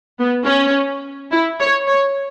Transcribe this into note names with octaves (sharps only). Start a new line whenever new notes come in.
B3
C#4
E4
C#5
C#5